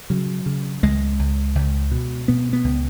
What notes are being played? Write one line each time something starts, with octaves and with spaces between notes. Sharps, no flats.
C#3 F#3
C#3
C#2 G#3
C#2
C#2
B2
B2 B3
B3
C#2